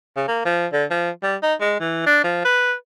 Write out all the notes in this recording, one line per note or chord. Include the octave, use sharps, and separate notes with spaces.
C#3
A#3
F3
D3
F3
G3
D#4
G#3
E3
D4
F3
B4